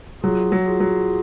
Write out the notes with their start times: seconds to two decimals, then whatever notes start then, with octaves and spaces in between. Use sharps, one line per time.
0.23 F#3 F4 G#4
0.52 F#3
0.66 F4 G#4
0.80 F#3